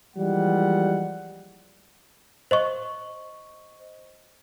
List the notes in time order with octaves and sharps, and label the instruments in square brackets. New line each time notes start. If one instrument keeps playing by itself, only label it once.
[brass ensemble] E3 F3 G3 G#3 A#3 F#5
[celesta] C5 D#5 C#6